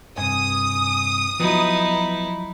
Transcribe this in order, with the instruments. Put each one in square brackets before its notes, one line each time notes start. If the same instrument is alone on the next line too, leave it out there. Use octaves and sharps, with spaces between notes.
[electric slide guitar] G2 C3 [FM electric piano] G#5 [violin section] D#6
[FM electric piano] F3 F#3 [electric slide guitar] B3 [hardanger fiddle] D#4 E4